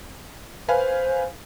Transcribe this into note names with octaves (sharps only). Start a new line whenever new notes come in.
B4 C5 F5 G#5